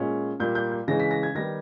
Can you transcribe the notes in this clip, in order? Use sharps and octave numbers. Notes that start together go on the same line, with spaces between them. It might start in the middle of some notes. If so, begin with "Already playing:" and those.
Already playing: A#2 G#3 C#4
A#2 G3 A#3 G6
G6
G6
C#3 E3 G#3 C#4 A#6
B6
A#6
G#6
D#3 G3 B3 A#6